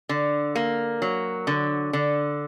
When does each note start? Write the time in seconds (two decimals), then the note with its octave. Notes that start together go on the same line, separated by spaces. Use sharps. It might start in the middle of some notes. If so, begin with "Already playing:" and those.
0.09 D3
0.55 A#3
1.02 F#3
1.47 D3
1.93 D3